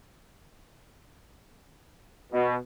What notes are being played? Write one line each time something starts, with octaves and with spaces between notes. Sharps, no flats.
B2